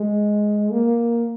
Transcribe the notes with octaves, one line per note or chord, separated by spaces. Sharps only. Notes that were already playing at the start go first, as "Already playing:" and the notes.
Already playing: G#3
A#3